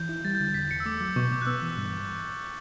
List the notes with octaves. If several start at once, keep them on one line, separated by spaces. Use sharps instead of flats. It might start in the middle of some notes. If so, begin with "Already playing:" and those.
Already playing: E3 G6
E4
G3 A6
G6
D3 A6
E2 B6
E2 C#7
E6
A3 D6
F#3
B2 C#6
B2 D6
F#6
B3 E6
E3
G2